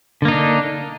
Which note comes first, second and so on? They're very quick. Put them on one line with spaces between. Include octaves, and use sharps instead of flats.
D3 A#3 D#4 D4